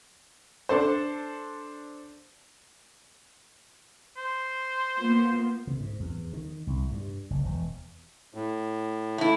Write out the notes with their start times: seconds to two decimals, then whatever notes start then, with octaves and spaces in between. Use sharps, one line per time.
0.69 D4 A4 C5
4.17 C5
4.97 A#3 B3 F4
5.67 C3
5.80 G#2
6.00 E2
6.33 D#3
6.67 C2
6.92 G2
7.30 F#1
7.45 E1
8.34 A2
9.18 A3 E4